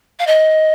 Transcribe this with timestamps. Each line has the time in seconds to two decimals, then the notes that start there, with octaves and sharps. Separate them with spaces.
0.19 F5
0.27 D#5